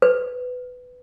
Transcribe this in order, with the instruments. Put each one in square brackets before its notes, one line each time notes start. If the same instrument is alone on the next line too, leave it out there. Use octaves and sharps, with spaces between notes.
[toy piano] B4